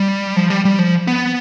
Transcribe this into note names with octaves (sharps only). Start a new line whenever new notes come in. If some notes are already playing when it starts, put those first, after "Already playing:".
Already playing: G3
F3
G3
G3
F3
B3